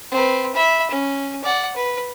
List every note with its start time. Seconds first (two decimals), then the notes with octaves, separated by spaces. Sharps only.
0.11 C4 B4
0.55 E5 B5
0.90 C#4
1.44 D5 F#5
1.76 B4